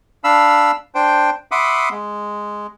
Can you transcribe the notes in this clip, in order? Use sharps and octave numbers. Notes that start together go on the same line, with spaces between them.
D4 F5 B5 E6
D4 C5 G5
E5 F#5 B5 C6 D6 D#6
G#3